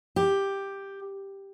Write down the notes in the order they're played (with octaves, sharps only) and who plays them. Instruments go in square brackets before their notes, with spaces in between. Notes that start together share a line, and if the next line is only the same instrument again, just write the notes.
[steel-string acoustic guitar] G4